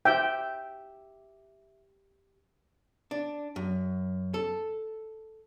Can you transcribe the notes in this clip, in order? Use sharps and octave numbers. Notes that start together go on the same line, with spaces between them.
G4 E5 G5
D4
F#2
A4